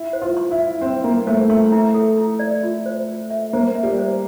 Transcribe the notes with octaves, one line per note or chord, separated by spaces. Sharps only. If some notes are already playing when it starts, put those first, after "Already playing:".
Already playing: E4
C5
F4
C6
E4
F5
C4 C5
A#3 F5
A3 C5
A3 C6
E4
A4
E4
D5
F4
C5
F4
E5
A#3 C5
E5
G3
C5